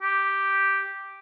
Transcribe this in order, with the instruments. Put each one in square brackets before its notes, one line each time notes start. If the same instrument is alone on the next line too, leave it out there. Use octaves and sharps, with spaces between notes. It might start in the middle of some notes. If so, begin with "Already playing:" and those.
[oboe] G4